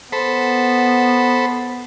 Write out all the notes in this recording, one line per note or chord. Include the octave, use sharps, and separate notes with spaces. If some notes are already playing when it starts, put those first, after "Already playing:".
B3 A4 C5 B5